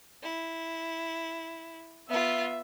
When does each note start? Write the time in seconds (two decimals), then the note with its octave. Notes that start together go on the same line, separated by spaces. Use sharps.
0.23 E4
2.09 B3 F4 E5